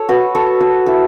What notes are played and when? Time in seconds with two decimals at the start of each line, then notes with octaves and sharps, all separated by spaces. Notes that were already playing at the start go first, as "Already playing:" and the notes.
Already playing: A4 C#5
0.09 F#4 B4
0.35 A4 C#5
0.60 F#4 B4
0.86 E4 A4